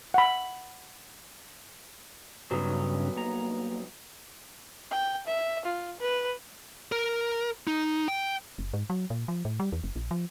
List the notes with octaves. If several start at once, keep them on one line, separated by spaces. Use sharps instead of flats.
F#5 B5
C2 G2 C#3 F#3 B3 C#4
A#3 A#5
G5
E5
F4
B4
A#4
D#4
G5
F#1
G#2
F#3
A#2
F3
A2
G3
E2
F#1
A#1
F3